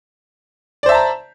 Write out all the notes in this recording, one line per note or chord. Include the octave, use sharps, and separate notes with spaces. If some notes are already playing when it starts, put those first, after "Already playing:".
C5 D5 E5 A5 A#5